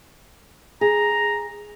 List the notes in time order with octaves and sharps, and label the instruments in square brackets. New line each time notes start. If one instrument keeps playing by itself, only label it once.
[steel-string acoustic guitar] G#4 [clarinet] A#5